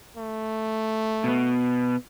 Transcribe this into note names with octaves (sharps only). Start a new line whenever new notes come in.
A3
B2 B3